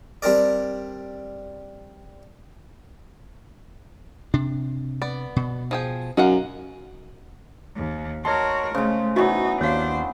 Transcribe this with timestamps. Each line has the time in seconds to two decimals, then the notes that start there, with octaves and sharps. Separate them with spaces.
0.22 G3 C4 D4 A#4 D5
4.34 C3 D4
5.02 B3 D5
5.36 B2
5.71 F3 G#4 G5
6.17 F#2 D#4 F5 F#5
7.77 D#2
8.25 F#4 A#4 C#5 D#5 A5 C6
8.75 C#3 G#3 A3 C5
9.16 E3 F#3 B3 D#4 F#4 D#5 C#6
9.61 D#2 D4 C5 C#5 F5